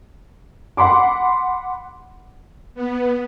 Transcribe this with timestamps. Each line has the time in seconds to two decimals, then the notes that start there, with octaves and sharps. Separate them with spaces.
0.77 F#5 B5 C6 D6
2.74 B3